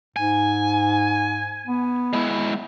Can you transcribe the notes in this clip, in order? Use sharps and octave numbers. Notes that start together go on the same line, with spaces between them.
G#2 G#5
B3
G#3 E4